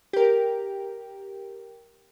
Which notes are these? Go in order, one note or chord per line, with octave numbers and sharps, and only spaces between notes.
G4 A#4